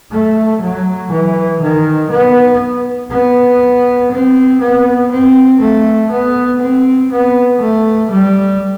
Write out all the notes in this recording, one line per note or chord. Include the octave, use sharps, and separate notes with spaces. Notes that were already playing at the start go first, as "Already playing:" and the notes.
A3
F#3
E3
D#3
B3
B3
C4
B3
C4
A3
B3
C4
B3
A3
G3